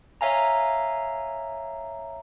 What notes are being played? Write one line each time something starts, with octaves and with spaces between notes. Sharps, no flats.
C#5 E5 F5 G#5 A#5